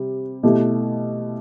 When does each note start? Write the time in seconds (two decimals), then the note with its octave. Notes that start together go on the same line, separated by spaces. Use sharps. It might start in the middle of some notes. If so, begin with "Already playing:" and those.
Already playing: C3 G3
0.43 B2 A3 E4 G4